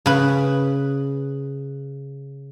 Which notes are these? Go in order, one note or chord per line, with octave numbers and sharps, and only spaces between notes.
C#3 B4